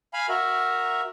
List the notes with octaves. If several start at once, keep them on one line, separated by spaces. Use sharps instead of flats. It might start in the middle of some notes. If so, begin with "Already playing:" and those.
F5 G#5 B5
F#4 A#4 E5